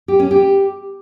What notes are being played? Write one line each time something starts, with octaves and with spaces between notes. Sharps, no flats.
G4
C#4
G4